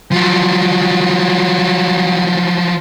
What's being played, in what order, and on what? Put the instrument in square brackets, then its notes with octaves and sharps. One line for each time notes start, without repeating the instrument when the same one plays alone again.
[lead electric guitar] F3 F#3